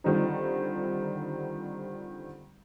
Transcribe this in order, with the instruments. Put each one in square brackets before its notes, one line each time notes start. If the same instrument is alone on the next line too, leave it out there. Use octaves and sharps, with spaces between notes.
[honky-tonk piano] D3 D#3 F3 G3 C4 D#4